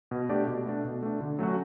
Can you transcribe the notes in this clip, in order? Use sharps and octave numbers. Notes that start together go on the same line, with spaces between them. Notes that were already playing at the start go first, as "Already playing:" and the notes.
B2
A3 D4 G4 D5
B2
A3 D4
B2
A3 D4
D3
F#3 A3 C#4 F#4